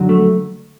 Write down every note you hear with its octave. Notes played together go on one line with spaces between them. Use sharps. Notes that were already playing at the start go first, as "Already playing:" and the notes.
Already playing: F2 D3 F#3
A3